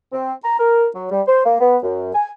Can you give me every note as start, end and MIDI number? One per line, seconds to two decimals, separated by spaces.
0.13 0.33 60
0.44 0.57 82
0.59 0.87 70
0.95 1.11 54
1.11 1.21 55
1.27 1.43 72
1.45 1.56 58
1.61 1.77 59
1.83 2.14 42
2.15 2.31 80